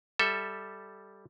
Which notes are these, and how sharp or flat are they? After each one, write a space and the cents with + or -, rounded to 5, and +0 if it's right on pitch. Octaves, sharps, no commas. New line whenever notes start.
G3 +0 A4 +0 E5 -10